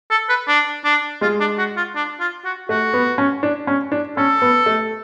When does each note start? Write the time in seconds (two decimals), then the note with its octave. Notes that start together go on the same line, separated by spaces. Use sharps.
0.11 A4
0.29 B4
0.48 D4
0.84 D4
1.21 G#3 F4
1.40 D4
1.58 F#4
1.77 F4
1.95 D4
2.20 F4
2.45 F#4
2.69 A3 F#4
2.94 B3
3.18 C#4
3.43 D4
3.67 C#4
3.92 D4
4.17 C#4 A4
4.42 B3
4.66 A3